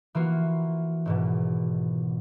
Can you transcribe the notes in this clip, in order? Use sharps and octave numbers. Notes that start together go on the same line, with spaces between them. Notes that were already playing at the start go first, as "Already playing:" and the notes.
E3 A#3 F4 F#4
G#1 G#2 B2